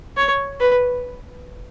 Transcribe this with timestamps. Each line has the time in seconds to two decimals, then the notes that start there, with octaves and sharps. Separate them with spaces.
0.17 C#5
0.60 B4